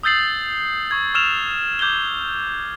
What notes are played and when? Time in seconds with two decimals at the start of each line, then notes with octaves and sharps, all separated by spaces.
0.03 D#6 E6 G6 A6 C7 F#7
0.91 C#6 G#6
1.14 C#6 E6 F6 E7 F7
1.79 D6 G6 G#6 E7 G7